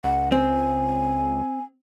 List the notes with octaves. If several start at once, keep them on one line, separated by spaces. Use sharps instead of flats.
C#2 F#5
C4 G#5